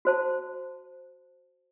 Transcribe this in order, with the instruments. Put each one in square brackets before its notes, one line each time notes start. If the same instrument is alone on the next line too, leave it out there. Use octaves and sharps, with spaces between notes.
[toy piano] F#4 C5 A5